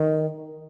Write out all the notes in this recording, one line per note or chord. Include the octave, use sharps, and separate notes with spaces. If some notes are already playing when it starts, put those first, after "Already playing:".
Already playing: D#3